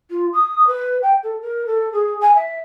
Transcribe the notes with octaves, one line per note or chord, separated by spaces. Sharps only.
F4
D#6
B4
G5
A4
A#4
A4
G#4
G#5
E5